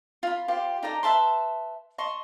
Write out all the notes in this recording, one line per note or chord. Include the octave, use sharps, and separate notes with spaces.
F4 B5
F4 G4 C5
D#4 A4 D5 A#5
B4 E5 A5 C6
D#5 A5 C6 C#6